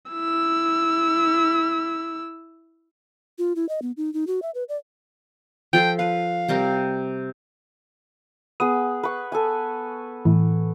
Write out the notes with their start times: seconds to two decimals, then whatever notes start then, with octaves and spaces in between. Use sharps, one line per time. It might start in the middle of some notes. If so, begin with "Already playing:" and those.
0.12 E4 E6
3.38 F4
3.56 E4
3.69 D#5
3.82 B3
3.97 D#4
4.14 D#4
4.27 F#4
4.42 E5
4.55 B4
4.69 D5
5.73 F3 A4 G5 C6
5.99 B4 F5
6.49 C3 G3 A#4
8.60 B3 G#4 D#6
9.03 B4 C#6
9.32 A4 G#5
10.25 A2 E3